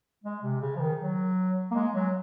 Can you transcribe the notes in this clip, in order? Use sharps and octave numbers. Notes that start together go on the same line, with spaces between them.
G#3
C3
C#3
F3
D#3
F#3
A#3
G#3
F#3